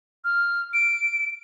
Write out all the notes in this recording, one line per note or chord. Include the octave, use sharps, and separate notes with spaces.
F6
D7